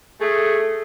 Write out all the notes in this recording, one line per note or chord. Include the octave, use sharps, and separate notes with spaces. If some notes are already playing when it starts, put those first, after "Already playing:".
A3 G#4